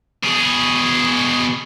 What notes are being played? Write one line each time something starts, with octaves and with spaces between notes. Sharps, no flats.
B2 G#4